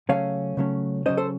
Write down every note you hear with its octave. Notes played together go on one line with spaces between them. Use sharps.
C#3 F#3 A3 C#4 C#5 F5
C#3 F#3 A3 C#4
C#3 F#3 A3 C#4 C5 D#5
A4 C5